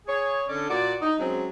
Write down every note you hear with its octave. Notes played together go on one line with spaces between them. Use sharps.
G#4 C#5
D3 C#4 A4 D5
A#2 F#4 D5
D#4
F#3 G#3 C4 C#4